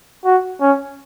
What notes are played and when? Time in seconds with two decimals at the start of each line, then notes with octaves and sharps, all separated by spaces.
0.25 F#4
0.61 C#4